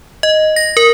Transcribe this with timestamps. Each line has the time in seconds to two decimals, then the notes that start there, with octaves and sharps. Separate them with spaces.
0.23 D#5
0.56 A#6
0.77 A#4